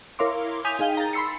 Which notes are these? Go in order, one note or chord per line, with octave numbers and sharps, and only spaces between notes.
E4 A#4 C#5 F5 C6 D6
G#5 D#6 G6 B6 D#7 F7
D#4 G#4 F5 G5 G7
A#5 A6
B5 C6 E6 C7 C#7